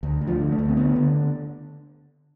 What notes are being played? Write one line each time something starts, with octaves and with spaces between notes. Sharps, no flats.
D2
D2
F3
D3
A3
D2
C4
D3 B3
D3